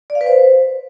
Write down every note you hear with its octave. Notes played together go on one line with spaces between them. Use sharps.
D5
F5
B4
C5